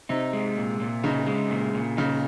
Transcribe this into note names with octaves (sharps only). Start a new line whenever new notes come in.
C3 D#4
G#3
A#2
A#2
C#3 D#4
G#3
A#2
A#2
C#3 D#4